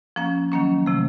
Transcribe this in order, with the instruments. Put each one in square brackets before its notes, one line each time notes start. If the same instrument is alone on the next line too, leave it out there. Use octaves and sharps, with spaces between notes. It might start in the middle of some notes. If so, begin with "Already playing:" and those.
[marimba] F3 A#3 C#4
D#3 F#3 A#3 C#4
C3 F3 A3